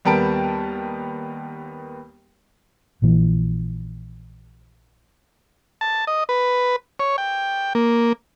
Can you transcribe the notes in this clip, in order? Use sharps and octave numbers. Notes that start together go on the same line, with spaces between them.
D#2 G3 B3 A#4 A5 D7
A#1 A#2 E3
A5
D#5
B4
C#5
G5
A#3